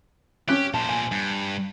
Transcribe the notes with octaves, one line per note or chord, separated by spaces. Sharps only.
C#4 G4 D6 F#6
A#2 C5 A5
G#5
G2